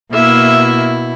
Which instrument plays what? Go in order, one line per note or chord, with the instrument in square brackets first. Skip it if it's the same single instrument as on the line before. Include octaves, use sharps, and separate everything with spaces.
[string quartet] B2 E4 [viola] A#3 E5